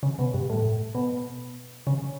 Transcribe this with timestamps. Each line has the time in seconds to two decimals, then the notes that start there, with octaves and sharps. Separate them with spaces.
0.03 C#3
0.19 B2
0.34 G2
0.50 A2
0.95 B2
1.87 C#3